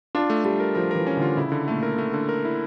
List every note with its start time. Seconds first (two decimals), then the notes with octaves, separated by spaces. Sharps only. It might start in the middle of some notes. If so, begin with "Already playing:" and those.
0.15 D4 F4
0.30 A3
0.45 G3 A3
0.60 A#4
0.75 F3 A#4
0.91 E3 A#4
1.07 C#4
1.17 D3 F4
1.37 C#3 E4
1.52 D3
1.68 A#2 A3
1.83 A#4
1.98 A3
2.14 D3
2.29 A#4
2.45 E4